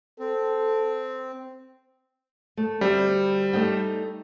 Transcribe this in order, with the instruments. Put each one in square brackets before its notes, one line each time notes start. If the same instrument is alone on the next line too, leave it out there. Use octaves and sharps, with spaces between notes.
[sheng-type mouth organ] C4 [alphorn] A4
[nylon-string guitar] A3
[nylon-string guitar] D2 C4 E5 [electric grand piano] G3
[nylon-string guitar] A3 D#4 G5